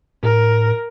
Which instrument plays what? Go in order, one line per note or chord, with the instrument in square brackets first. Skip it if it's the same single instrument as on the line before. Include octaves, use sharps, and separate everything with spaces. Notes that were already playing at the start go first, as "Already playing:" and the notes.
[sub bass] A2 [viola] A#4